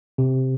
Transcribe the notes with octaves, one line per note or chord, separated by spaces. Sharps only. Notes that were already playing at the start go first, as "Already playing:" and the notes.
C3